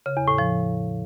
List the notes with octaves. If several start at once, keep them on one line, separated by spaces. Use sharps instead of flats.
C#3
E2
A2
F3